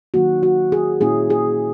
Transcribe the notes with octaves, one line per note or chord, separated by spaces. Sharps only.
D#3 F#3 A#3 F#4
F#4
G#4
A#2 A#3 C#4 E4 G#4
G#4